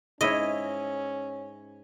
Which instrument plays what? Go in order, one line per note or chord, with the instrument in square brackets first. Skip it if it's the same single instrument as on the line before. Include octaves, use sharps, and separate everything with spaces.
[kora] G#2 E4 C#5 [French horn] C#4 [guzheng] D#5